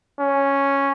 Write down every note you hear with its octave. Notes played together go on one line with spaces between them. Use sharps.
C#4